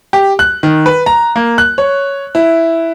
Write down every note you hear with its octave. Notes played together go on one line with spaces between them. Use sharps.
G4
F#6
D#3
B4
A#5
A#3
F#6
C#5
E4